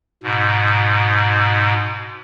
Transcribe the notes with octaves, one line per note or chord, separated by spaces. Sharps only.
G#2 B2